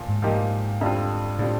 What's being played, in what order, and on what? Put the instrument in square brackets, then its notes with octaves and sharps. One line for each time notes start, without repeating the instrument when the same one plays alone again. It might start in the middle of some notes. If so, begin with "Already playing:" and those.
Already playing: [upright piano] A#2 F3
[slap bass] G#2
[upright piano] A#2 F3 A#3 D#4 G4
F2 D3 G3 C4 F4
[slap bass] A2 [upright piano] D3 G3 C4 F4